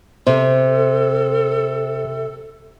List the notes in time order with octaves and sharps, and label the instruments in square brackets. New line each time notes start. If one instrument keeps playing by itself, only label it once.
[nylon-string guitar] C3 [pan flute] A4 [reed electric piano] C5